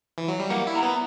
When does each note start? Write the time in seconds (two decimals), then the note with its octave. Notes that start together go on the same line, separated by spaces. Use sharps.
0.18 E3
0.28 F#3
0.39 G3
0.50 A#3 F#5
0.67 E4
0.74 A#5
0.83 B3